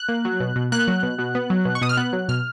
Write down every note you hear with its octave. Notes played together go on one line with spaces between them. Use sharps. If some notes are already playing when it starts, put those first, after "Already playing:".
Already playing: F#6
A#3
F#3
B2
B2
A#3 F#6
F#3
B2
B2
B3
F#3
B2
C#6
B2 D#6
F6
B3 F#6
F#3
B2 F6